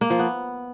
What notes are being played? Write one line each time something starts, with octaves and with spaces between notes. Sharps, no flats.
A#3
F3
B3